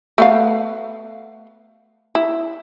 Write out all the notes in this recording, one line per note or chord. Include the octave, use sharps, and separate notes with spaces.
A3 B3 F5
E4